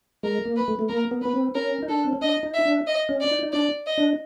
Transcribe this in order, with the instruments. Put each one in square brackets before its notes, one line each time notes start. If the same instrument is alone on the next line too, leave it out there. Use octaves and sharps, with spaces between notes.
[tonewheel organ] G#3 [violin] A#4
[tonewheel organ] A#3
[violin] B4
[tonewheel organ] A3
A3
[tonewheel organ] A#3 [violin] A#4
[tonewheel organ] B3
[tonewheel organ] B3 [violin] B4
[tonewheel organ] C4
[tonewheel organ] C#4 [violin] A#4
[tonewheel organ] D#4
[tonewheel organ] D4 [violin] A4
[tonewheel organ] C4
C#4
[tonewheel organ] D4 [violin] D#5
[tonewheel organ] D#4
[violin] E5
[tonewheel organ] D4
[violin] D#5
[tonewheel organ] C#4
[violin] D5
[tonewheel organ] D#4
D#4
[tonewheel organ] D4 [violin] D5
[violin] D#5
[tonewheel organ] D4